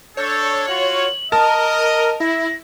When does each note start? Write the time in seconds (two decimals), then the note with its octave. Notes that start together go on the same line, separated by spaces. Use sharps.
0.17 D4 A4 C#5 G6
0.68 F4 F#4 F#7
1.32 A#4 D#5 A5 F6
2.20 E4 A#6